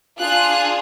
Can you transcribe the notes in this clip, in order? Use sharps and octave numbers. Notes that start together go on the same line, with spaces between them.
D4 F4 G#4 F#6